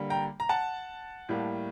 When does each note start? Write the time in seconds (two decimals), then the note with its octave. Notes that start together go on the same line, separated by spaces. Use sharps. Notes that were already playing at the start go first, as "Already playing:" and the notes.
Already playing: D3 G3 A#3
0.10 G5 A#5
0.40 A#5
0.49 F#5 A5
1.29 A2 G3 A#3